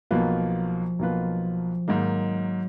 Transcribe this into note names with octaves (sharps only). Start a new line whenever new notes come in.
B1 B2 F3 A#3 F4 B4
B1 B2 A#3 F4 B4
G#2 D#3 F#3 A#3